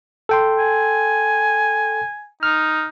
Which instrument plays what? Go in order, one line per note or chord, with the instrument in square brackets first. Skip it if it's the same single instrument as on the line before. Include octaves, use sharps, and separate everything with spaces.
[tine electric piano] A4 G5 C6
[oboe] G#5
[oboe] D#4 [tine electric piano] F6